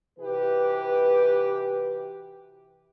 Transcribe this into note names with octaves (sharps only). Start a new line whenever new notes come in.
C3 E3 F#4 G4 B4